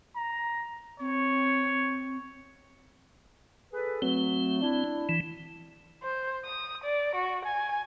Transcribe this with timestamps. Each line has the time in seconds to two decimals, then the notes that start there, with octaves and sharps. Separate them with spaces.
0.16 A#5
1.00 C4 C#5
3.74 G#4 A4 B4
4.02 F#3 A3 C4
4.62 D4 E4
5.09 E3
6.03 C5
6.45 D#6
6.84 D5
7.15 F#4
7.45 G#5